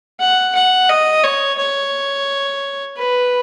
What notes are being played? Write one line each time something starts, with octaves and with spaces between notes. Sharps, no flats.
F#5
F#5
D#5
C#5
C#5
B4